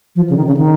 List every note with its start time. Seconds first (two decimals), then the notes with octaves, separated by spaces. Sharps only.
0.16 F3
0.30 C#3
0.37 D#3
0.47 C#3
0.57 D#3